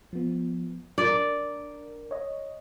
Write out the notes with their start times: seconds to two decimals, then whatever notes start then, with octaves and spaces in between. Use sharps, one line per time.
0.13 F3 B3
0.98 D4 A#4 D5
2.11 C#5 D#5